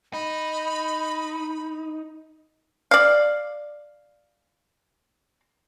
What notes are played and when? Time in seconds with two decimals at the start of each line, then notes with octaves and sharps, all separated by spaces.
0.13 D#4 B5
2.91 D5 F5